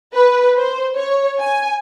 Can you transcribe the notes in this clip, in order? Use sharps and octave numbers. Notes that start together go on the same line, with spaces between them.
B4
C5
C#5
G#5